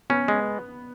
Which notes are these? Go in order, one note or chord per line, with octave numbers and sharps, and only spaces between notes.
B3 C#4
G#3